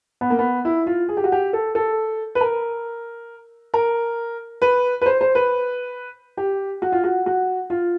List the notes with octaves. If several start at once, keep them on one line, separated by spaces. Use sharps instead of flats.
B3
A#3
B3
E4
F4
G#4
G4
F#4
G4
A4
A4
B4
A#4
A#4
B4
B4
C5
C5
B4
G4
F#4
F4
F#4
F#4
F4